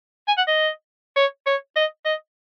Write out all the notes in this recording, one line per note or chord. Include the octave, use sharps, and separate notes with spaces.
G#5
F#5
D#5
C#5
C#5
D#5
D#5